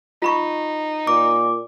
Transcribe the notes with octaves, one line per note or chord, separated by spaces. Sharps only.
D#4 F4 B5 C#6
A#2 D6